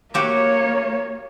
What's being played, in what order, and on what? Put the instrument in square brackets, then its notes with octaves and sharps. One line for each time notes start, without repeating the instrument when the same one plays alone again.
[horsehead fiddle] A#3 C#5 [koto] F#4 G4 E5